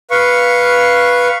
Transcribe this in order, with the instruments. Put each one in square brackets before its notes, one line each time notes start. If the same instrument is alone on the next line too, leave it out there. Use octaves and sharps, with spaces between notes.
[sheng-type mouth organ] B4 F5 C#6